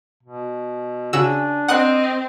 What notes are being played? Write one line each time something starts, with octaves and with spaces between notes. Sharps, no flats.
B2
C#3 D4 F#4 G#5 E6
C4 D#5 F#5 D#6 F#6